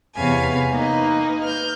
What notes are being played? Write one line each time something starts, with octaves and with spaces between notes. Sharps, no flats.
E2 C3 B4 C#5 F5 G#5
A#3 D#4 B4 D#5
F6 G6